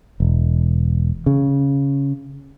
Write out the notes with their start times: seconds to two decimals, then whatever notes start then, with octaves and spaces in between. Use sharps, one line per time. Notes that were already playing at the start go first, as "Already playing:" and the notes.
0.20 E1
1.26 C#3